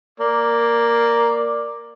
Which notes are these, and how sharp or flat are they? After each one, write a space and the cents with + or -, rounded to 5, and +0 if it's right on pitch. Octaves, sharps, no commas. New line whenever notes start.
A#3 +0 D5 +0